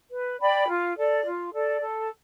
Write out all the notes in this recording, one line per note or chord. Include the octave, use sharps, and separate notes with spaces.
B4
D5 G5 B5
F4
A4 D5
F4
A4 D5
A4